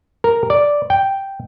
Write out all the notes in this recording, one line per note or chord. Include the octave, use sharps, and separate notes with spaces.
A#4
D5
G5